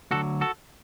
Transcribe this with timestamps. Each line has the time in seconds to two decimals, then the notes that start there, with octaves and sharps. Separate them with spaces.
0.11 D2 D3 F#3 F#4 A4
0.41 F#4 A4